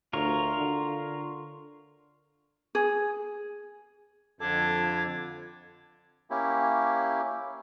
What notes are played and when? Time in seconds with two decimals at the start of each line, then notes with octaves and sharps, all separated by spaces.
0.13 D2 F4 A#4 C#5
0.58 D3
2.75 G#4
4.40 F2 D3 D4 A4 D6 G#6
6.30 A#3 C#4 E4 G4